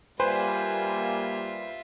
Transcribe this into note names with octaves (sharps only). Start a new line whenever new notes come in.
G3 A#3 F4 B4 C5 E5 G#5 C6